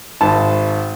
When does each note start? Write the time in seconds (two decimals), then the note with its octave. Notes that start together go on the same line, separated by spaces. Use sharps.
0.21 G#1 A5